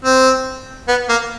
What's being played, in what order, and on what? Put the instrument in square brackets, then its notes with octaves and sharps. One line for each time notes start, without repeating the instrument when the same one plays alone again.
[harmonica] C4
B3
A#3